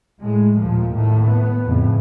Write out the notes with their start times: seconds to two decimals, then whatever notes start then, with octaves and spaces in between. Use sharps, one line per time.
0.21 A2 G#3
0.60 D#2 A#2 F3
0.94 A2 D#3 A3
1.25 B3
1.66 F2 A2 C#3